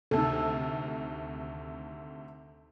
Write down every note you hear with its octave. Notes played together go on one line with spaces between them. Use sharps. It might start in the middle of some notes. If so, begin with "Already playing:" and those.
D2 C3 D#3 A4